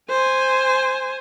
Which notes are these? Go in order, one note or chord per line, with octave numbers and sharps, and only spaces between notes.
C5 G#5